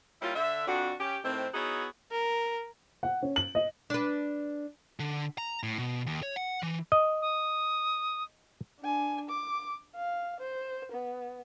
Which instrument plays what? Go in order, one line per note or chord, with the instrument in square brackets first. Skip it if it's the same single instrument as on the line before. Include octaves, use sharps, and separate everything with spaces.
[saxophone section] G3 A#3 C#4 E4 F4
D3 E5
F2 D4 F#4
C#4 G4
A2 D#3 C4
B3 D#4 E4 F#4 G#4 C#5
[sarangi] A#4
[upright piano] F#5
C#4
F#7
D#5
[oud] D4 B4
[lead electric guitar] D3
A#5
A2
B2
D#2
C#5
F#5
E3
[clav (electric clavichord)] D#5
[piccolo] D#6
[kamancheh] D4 G#5
D6
F5
C5
B3